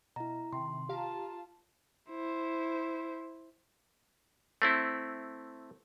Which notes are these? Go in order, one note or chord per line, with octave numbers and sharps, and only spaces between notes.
B2 E4 A#5
C3 D#3 C6
F4 G4 F5 A5 A#5
E4 C5
A3 C4 E4